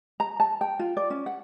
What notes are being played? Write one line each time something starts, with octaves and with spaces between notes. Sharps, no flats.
A#5
A5
G5
F4
D5
C#4
F#5